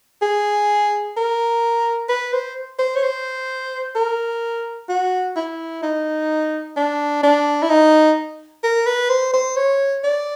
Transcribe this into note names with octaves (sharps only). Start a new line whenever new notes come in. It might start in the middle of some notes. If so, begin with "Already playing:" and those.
G#4
A#4
B4
C5
C5
C#5
C5
A#4
F#4
E4
D#4
D4
D4
E4
D#4
A#4
B4
C5
C5
C#5
D5